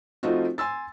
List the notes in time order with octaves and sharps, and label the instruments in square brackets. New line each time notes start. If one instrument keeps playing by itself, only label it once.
[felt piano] F3 A3 C4 D#4 F4 F#4
G#5 C6 E6 A6